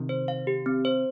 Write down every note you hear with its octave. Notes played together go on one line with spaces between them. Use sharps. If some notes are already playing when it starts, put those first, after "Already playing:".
Already playing: C3 D#3
C5
F5
G4
C4
C5